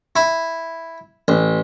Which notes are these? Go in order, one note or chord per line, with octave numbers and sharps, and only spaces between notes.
E4
A1